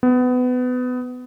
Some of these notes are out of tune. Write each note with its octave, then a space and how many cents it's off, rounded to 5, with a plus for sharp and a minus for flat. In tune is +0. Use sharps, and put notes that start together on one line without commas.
B3 +25